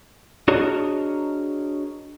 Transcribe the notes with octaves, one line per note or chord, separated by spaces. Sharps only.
D4 F#4 G#4 A#4 C#5 D#5